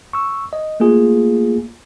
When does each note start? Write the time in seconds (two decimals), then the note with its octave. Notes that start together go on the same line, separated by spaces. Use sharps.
0.13 C#6 E6
0.53 D#5
0.80 A3 A#3 F4 G#4